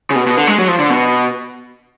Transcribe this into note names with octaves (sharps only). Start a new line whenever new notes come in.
C#3
B2
B2
D3
G#3
F#3
F3
D3
B2